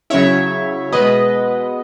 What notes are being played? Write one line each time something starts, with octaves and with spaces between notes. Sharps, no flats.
C#3 F#3 C#4 E4 C#5 E5
B2 G#3 B3 B4 D#5